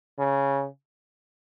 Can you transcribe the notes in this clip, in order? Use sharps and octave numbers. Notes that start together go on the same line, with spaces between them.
C#3